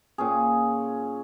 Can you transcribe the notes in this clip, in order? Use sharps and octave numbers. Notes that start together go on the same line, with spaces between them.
A#2 C#4 G#4